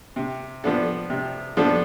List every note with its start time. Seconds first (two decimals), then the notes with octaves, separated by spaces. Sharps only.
0.16 C3
0.64 F3 B3 D4 A4
1.10 C3
1.57 F3 B3 D4 A4